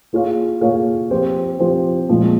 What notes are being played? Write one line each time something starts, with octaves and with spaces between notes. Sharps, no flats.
A#3 F4 G#4 C#5 F5
A#3 F4 G#4 C#5 F5
F3 C4 G4 C5
F3 C4 G4 C5
A#2 F3 G#3